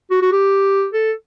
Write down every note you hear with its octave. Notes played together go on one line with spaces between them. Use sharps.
F#4
F#4
G4
A4